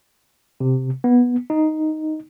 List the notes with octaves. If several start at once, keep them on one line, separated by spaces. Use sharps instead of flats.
C3
B3
D#4